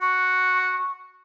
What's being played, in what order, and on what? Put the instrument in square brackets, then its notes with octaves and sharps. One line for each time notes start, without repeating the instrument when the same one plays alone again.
[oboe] F#4 [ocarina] C#6